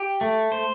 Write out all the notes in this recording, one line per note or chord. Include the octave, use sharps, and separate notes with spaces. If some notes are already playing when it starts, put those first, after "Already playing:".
Already playing: G4
A3
C5